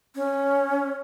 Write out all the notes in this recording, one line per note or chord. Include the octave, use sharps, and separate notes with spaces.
C#4